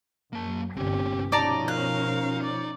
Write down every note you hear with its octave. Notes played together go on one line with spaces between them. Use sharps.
F#2 A#3 A5
G1 C2 A#2 C4 C#4 G4
B2 F3 C#4 D#4 D5 A5 A#5
A#4 F5 F#6
D5